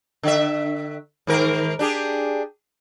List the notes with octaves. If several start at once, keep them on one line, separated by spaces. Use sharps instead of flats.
D3 E5
G#2 D#3 A#4
D4 G4 G#4